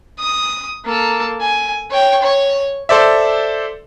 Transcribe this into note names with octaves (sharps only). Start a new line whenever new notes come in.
D#6
A#3 A4
G#5
C#5 G5
C#5
A4 C5 D5 E5